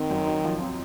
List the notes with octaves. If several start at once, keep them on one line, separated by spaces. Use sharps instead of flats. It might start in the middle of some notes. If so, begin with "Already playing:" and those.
Already playing: D#3 C4
F#2
D#4
F3
C4